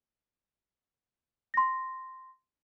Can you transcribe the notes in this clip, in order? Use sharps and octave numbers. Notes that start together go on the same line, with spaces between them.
C6 A#6